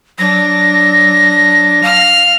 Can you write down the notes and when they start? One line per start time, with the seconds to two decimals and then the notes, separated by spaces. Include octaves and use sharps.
0.19 F#3 D4 A#6
1.83 F5 F6